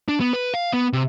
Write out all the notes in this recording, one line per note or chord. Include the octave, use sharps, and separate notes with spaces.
D4
B3
B4
F5
B3
C3